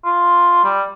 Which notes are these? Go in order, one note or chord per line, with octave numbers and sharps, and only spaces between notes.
F4
G3